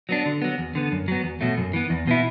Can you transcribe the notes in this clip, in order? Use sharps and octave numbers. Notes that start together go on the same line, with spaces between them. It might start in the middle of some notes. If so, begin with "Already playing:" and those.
F#3 B3 D4
D3
F#3 B3
E2
D3 B3
F#2
F#3 B3
E2
B2 F#3 A3
F#2
E3 B3
E2
B2 B3 E4